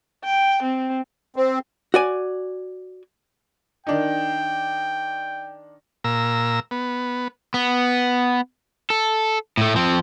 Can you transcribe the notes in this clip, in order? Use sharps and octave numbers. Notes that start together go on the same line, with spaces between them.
G5
C4
C4
F#4 D5 G#5
D#3 D4 D#4 G5
A#2 A#5 E6
B3
B3
A4
A2 A3
F3 C4